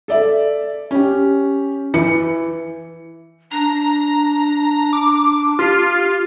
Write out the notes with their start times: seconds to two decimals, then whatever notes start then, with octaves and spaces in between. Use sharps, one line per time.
0.08 A4 D5 E5
0.91 C#4 G4
1.94 E3 C#7
3.51 D4 A#5
4.93 D6
5.59 F4 G4